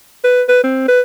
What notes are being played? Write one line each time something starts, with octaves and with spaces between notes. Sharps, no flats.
B4
B4
C4
B4